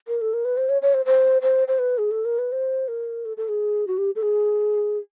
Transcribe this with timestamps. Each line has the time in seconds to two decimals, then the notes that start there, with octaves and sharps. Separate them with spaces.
0.08 A#4
0.21 A4
0.33 A#4
0.45 B4
0.57 C5
0.69 C#5
0.82 C#5
0.94 C5
1.06 C5
1.42 C5
1.68 C5
1.79 B4
1.98 G#4
2.11 A4
2.25 A#4
2.38 B4
2.52 C5
2.88 A#4
3.25 A4
3.37 A4
3.49 G#4
3.87 F#4
3.98 G4
4.16 A4
4.22 G#4